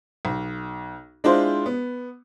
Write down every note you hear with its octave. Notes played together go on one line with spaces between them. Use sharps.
B1
G#3 D4 E4 F4 C5
B3